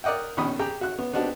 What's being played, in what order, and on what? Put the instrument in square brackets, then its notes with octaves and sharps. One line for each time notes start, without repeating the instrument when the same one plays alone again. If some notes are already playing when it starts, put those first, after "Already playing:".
[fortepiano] A#4 D5 D#5 F#5 G5
A#1 B2 D#3 C#4 B5 D#6
G4 G#4 G5 A#5
F#4 F#6
B3
B3 C4 D4 D#4 F#4 G4